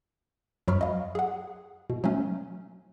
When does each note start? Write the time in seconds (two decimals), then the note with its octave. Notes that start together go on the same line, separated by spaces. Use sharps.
0.68 F#2 F#3 B5 C#6 F6
0.81 D#5 F5
1.15 G#4 F#5
1.90 B2
2.04 F#3 A3 C#4